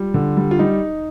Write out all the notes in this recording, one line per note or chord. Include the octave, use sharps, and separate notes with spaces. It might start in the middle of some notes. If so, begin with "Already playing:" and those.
Already playing: G3 F4
D3
G3
F4
G3 D#4